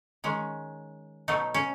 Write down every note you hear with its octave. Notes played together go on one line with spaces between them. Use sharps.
D#3 G#3 C#4
B2 F#3 A3 D#4
C#4